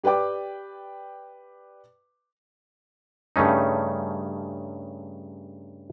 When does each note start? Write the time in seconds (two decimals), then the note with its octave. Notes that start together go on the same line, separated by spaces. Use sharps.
0.04 G4 B4 D5 G5 D6
3.36 G2 C#3 A3 C#4 D#4